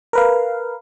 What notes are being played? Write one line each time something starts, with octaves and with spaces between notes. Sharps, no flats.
A#4 B4 F5